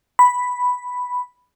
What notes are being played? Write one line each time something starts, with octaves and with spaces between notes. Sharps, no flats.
B5